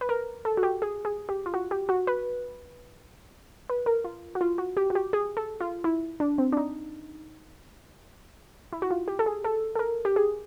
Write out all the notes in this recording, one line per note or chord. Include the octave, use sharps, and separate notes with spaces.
B4
A#4
A4
F#4
G4
G#4
G#4
G4
F4
F#4
G4
F#4
B4
B4
A#4
F4
F#4
F4
F#4
G4
F#4
G4
G#4
A4
F4
E4
D4
C4
D4
D#4
E4
F#4
F4
G4
A4
G#4
A4
A4
A#4
G4
G#4